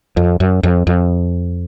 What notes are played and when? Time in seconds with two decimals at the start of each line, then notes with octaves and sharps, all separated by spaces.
0.17 F2
0.40 F#2
0.63 F2
0.87 F2